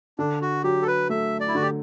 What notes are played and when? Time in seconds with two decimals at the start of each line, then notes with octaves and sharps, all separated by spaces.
0.19 D3 D4
0.42 F#4
0.64 F#3 G4
0.82 A4
0.87 B4
1.10 A3 E5
1.40 D5
1.48 E4
1.55 D3 F#4
1.62 G4